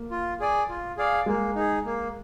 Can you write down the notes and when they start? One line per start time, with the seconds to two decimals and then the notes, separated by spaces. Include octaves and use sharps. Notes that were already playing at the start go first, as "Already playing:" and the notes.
Already playing: A#3
0.11 F4
0.40 G#4 D5 G#5
0.69 F4
0.97 G#4 D5 F5
1.26 G#3 A#3
1.55 D#4 G#4
1.85 A#3